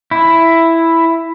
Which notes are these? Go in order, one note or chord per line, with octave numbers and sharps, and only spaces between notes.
E4